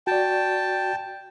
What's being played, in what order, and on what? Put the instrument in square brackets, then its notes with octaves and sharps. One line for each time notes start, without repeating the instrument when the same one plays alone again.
[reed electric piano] F#4 D5 [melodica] G5 A5